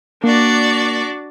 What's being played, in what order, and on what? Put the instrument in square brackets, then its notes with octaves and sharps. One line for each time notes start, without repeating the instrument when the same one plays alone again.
[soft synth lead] A#3 [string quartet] D4 F#4 D5